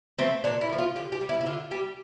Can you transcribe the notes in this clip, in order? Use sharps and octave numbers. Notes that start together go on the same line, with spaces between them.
F3 A3 C4
A#2 D4
E4
F3 A3
F4
D3 G4
G4
G3
E4
E4
D3 F4
G3 G4